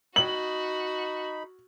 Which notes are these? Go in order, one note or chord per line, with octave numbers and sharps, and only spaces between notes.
D#4 F#4 B5 F#7